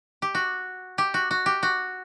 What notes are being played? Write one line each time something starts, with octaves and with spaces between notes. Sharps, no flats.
G4
F#4
G4
F#4
F#4
G4
F#4